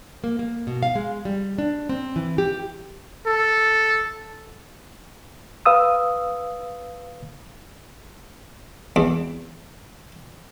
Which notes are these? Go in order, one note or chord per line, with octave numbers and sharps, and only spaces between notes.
A#3
A#3
B2
F5
G#3
G3
D4
C4
E3
G4
A4
B4 F5 D#6 E6
E2